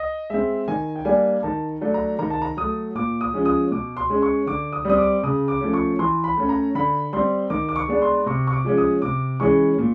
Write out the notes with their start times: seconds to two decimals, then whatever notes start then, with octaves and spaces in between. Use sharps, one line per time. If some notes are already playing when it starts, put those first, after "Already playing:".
Already playing: D#5
0.30 G#3 C4 E5
0.68 D#3 G#5
0.95 G5
1.05 G3 A#3 D4 G#5
1.43 D#3 A5
1.81 F#3 A3 D4
1.94 A#5
2.19 D#3 A#5
2.30 A5
2.42 A#5
2.57 F#3 A3 D#6
2.95 A#2 D6
3.21 D#6
3.33 F3 G#3 C#4
3.45 D#6
3.71 B2 D6
3.97 C6
4.10 G#3 C#4
4.22 C#6
4.47 D3 D6
4.72 D#6
4.85 G3 C4 D#6
4.98 D6
5.24 C#3 D#6
5.48 D6
5.61 F3 A3 C#4
5.74 C#6
5.99 E3 C6
6.24 B5
6.37 A3 C#4
6.49 A#5
6.75 D3 B5
7.13 G3 C4 C6
7.50 D#3 D6
7.69 D6
7.76 C#6
7.88 G#3 B3 D4
8.02 C6
8.26 C3 C#6
8.47 C#6
8.52 D6
8.64 F3 G#3 C#4
8.78 D#6
9.02 C3 D6
9.40 E3 G#3 C#4 C#6
9.78 A#2